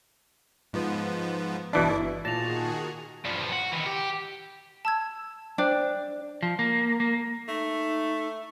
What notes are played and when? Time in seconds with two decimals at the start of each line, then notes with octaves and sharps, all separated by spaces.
0.73 G#2 F3 B3
1.73 G1 B2 E3 D4 E4
2.25 A#2 D#3 F#4 G#4 A5 A#6 F7
3.25 G2 F3
3.52 F#4
3.73 D#3 E3
3.87 G4
4.85 A5 E6 G#6
5.58 D4 C5 G5
6.42 F3
6.59 A#3
7.00 A#3
7.48 A3 D#4